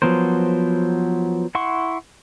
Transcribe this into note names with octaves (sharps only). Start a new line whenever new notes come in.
F3 F#3 B3 A#4 C5
E4 F#5 C6 C#6